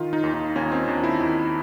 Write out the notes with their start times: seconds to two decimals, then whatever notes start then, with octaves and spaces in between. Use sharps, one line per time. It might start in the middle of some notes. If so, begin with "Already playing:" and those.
Already playing: D#3 F4
0.13 D#4
0.24 D#2
0.34 D#4
0.56 D#2 C#4
0.72 C4
0.88 D#2 D4
1.04 E4
1.20 D#2